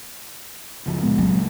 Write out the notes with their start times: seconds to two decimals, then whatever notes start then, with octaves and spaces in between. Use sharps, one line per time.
0.86 F#1 C#2 F3
1.03 A#2 G#3 B3
1.18 G2 C#3 F#3
1.33 C#2 A#3